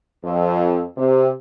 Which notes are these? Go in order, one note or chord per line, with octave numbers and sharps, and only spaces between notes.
F2
C3